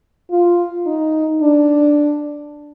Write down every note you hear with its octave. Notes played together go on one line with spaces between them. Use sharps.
F4
D#4
D4